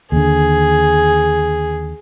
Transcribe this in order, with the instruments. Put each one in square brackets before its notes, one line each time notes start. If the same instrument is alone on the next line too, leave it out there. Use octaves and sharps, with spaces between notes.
[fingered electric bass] D#2 D3 [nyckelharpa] G#4